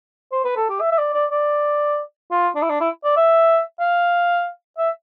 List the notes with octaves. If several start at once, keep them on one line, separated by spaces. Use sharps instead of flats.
C5
B4
A4
G4
E5
E5
D5
D5
D5
F4
D4
E4
D4
E4
D5
E5
F5
E5